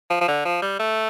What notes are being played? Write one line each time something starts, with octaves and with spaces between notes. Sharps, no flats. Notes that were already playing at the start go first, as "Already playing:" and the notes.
F3
F3
D3
F3
G3
A3